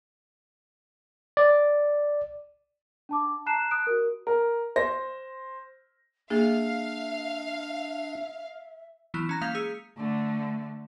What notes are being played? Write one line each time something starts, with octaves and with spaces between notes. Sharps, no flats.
D5
D4 A5 D6
A5 A#5 F#6 C7 E7
D#6 F#6 D7
F#4 A#4
A#4
C5 A#6
A#3 D4 G#4 E5 F5
E3 F#3 B3 E4 F6 F#6
C#4 A#5 A#6
G#3 A#3 F5 G6 B6 F7
G#4 E6 B6 C#7
D3 A3